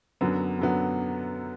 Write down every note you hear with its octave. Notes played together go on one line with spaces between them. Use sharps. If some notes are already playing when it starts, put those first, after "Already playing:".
F#2 D3 F#3 B3
F#2 D3 F#3 B3